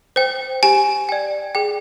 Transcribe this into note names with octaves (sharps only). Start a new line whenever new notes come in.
C5 G5
G4 G#5
D5 G5
G#4 G5